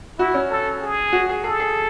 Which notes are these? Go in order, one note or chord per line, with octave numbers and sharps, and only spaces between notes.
E4 F#4
C#4
A4
G#4
F#4
G#4
G#4 A4
G#4